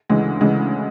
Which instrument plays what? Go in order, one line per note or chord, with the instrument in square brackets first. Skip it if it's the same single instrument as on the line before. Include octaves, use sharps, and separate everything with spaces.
[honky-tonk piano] D2 C#3 E3 G#3
D2 C#3 E3 G#3